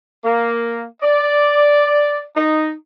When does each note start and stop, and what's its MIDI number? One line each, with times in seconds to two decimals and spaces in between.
0.24 0.84 58
1.01 2.23 74
2.35 2.71 63